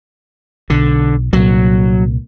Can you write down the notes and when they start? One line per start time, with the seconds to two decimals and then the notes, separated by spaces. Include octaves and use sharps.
0.70 B1 D3
1.33 C2 A#2 F#3